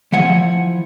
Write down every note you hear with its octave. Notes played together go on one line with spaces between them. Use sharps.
E3 F3 F#5 G#5